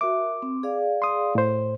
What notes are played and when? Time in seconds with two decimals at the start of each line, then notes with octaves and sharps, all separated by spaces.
0.01 F#4 A#4 E5 D6
0.42 C4
0.63 G#4 D5 F5
1.02 C6 D#6
1.35 A2 C5